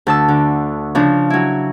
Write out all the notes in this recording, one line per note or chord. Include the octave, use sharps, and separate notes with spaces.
D2 A5 E6
D3
C#3 F3 D4
F#3 E4